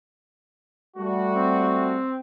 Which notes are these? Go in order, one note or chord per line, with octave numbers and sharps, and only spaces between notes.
G3 A3 F#4
C4